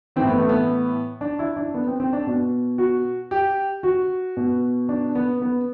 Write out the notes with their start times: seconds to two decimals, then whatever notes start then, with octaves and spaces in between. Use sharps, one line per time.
0.16 A2 E3 C4
0.27 B3
0.38 A3
0.49 B3
1.21 D4
1.39 E4
1.56 D4
1.74 B3
1.87 C4
2.00 C4
2.13 D4
2.27 B2
2.78 F#4
3.31 G4
3.83 F#4
4.37 B2
4.89 D4
5.15 B3
5.42 B3